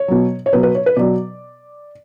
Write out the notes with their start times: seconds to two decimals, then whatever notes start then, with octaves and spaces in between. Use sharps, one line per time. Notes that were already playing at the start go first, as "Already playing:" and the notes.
Already playing: C#5
0.08 B2 F#3
0.46 C#5
0.53 B2 F#3 B4
0.63 B4
0.75 C#5
0.86 B4
0.96 B2 F#3 D5